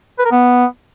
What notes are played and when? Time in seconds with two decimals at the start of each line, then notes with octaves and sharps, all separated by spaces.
0.19 B4
0.25 A#4
0.32 B3